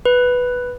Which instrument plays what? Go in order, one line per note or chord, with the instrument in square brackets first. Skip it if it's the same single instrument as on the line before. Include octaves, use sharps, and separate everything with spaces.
[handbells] B4